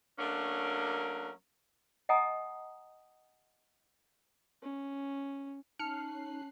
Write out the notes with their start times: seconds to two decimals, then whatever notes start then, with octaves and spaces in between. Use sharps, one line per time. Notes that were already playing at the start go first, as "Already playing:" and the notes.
0.19 F#3 A3 A#3 C#4 D4 A#4
2.09 D#5 F#5 G#5 A#5 D#6
4.63 C#4
5.79 C#4 D#4 A5 F6 F#6 C7 C#7